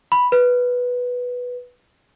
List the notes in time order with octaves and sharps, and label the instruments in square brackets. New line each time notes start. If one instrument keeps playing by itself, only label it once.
[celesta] B5
B4